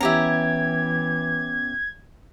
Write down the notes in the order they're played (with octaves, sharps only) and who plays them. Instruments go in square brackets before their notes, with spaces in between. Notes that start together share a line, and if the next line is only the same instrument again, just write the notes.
[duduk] E3 [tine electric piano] B3 C#4 [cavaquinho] E4 G4 A#5 [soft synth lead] G#6